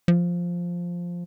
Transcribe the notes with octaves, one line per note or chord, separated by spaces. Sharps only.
F3